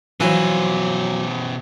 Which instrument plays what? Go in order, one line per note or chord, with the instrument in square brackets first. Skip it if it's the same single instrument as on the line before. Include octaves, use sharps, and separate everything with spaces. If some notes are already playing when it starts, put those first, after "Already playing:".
[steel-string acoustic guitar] F2 F#3 F5 [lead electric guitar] B2 C5 [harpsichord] E3